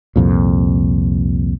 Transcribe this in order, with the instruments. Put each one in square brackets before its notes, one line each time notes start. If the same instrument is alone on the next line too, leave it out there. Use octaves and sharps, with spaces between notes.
[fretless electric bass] C2 F2 A#2